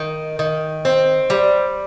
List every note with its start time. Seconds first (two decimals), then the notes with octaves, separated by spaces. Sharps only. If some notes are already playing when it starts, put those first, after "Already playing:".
Already playing: D#3
0.39 D#3
0.85 C4
1.30 G3